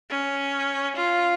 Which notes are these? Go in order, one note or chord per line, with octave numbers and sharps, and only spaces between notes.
C#4
F4